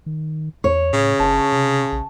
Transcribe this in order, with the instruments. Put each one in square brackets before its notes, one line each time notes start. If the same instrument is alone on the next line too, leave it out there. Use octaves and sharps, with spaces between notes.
[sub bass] D#3
[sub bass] E2 [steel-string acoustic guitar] C#5
[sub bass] A2 [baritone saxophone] C#3
[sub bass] F#1 [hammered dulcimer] A5 C#6
[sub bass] C3
A#1